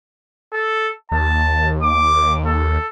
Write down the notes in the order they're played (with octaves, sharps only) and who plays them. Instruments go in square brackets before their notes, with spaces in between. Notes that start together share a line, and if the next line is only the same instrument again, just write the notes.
[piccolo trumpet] A4
[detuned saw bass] D#2 [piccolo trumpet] A5
[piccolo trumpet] D6
A4